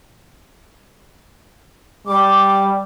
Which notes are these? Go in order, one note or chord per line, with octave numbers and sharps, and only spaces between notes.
G3 D6